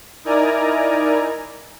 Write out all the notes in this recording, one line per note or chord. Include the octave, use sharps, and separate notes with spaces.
D#4 E4 A#4 D5 G#5 A#5